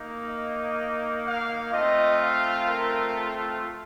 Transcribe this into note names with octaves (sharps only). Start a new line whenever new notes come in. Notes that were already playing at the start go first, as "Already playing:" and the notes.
Already playing: A#3 D#4
D#5
F5
A3 C4 F4 D#5
F5
A#4
A4